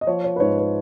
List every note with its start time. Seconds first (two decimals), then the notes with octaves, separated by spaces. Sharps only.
0.01 D#5
0.07 F3 C#5
0.24 C#5
0.36 B4
0.40 G#2 C#5
0.57 B4